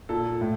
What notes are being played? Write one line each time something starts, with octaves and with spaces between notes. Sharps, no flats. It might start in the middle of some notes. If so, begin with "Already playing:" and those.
A#2 A4
A2